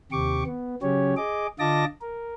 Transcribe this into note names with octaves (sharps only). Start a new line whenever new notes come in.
D#2 C3 G4 C#6 D6
B3
C#3 F#3 C#4 G4 C#5
G#4 D#5 D6
D3 F4 D#5 A5 D6 A#6
A#4